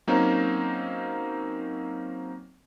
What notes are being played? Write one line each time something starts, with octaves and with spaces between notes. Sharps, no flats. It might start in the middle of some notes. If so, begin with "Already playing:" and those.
F#3 A#3 C4 C#4 D#4